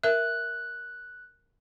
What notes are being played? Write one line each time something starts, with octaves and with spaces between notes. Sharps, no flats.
A#4 E5 F#6